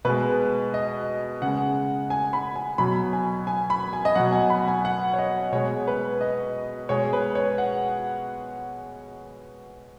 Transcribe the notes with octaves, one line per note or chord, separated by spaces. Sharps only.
B2 G#3 B4
D#5
C#3 G#3 F#5
G#5
B5
G#5
B2 F#3 B5
G#5
G#5
B5
G#5
D#5
B2 F#3 F#5
G#5
B5
G#5
F#5
C#5
D#5
B2 G#3 C#5
B4
D#5
B2 G#3 C#5
G#4
B4
C#5
F#5